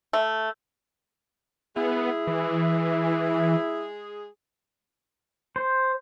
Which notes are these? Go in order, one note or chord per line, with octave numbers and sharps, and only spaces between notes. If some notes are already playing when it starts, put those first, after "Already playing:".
A3
G#3 B3 E4 G#4
E3
C5